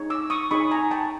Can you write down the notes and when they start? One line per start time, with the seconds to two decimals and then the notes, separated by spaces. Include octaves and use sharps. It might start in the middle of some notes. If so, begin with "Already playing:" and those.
Already playing: D#4 G#4 C#5
0.10 D6 E6
0.30 C#6 D#6
0.51 D#4 G#4 C#5 B5 C#6
0.71 G#5 A#5
0.91 G5 A5